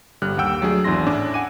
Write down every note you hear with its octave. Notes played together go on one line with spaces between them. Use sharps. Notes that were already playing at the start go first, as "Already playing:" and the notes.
G1 D3 G3 F6 F#6
D#2 G4 F#5 G5 E6
F#3 A3 D4 G#4
G#1 E2 D4 E4 C6 A#6
A2 C#4 D4 D6
F#5 G#5 D6 D#7